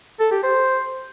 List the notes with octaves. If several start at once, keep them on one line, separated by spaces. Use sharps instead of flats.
A4
G4
C5